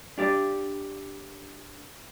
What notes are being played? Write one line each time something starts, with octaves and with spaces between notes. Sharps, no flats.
D4 G4 D5